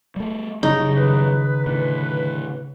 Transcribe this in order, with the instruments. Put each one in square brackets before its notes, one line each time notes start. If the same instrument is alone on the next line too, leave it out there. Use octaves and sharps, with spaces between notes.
[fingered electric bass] G3 A3
[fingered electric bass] F#1 G3 [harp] C#3 [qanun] D#4
[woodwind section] D#3 B4
[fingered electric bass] A2 D3